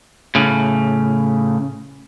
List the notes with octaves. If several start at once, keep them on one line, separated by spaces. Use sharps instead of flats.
A2 C#3